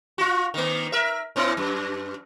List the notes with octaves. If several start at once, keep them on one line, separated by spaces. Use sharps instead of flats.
F4 F#4
D#3 A#3
A#4 E5
A#2 B3 E4
F#2